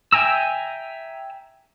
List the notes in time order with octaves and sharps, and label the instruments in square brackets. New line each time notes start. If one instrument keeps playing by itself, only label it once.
[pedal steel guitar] E5 G5 G#5 A#5 E6